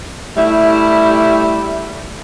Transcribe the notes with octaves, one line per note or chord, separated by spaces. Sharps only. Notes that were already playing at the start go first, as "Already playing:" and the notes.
G3 A3 E4